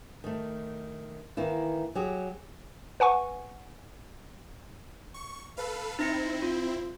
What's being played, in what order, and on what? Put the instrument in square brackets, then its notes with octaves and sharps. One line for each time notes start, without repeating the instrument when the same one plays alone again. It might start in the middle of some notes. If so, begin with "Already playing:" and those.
[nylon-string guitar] D#3 A3
D#3 E3 A#3 E4
F#3 G4 G#4
[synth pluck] B4 F#5 G#5 C#6
[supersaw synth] C#6
A4 B4 F5
[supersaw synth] C4 E4 [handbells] D#4 A#6 C#7
[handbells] F4